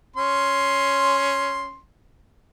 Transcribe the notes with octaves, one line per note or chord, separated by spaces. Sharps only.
C#4 C6